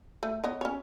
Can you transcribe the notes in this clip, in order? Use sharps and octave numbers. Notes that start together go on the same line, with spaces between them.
A3
B3 C#5 D#5
C#4 C#5